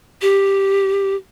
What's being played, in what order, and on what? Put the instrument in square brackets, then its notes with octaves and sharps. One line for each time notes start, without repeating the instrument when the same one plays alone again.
[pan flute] G4